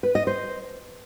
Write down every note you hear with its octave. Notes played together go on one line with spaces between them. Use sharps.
B4
D#5
C5